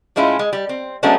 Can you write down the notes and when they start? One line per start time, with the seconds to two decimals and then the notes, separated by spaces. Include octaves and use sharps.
0.16 A2 G#3 C#4 E4 F4
0.39 G#3
0.53 G3
0.69 C4
1.03 F#3 G#3 A3 B3 C#4 D4